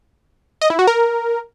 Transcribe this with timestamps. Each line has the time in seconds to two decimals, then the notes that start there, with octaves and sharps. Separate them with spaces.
0.61 D#5
0.70 E4
0.79 F#4
0.87 A#4